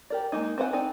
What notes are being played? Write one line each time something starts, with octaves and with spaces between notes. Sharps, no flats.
G4 A#4 D5
G#3 A#3 D#4
C4 B4 F#5 G#5
B3 C4 D#4 D5 G#5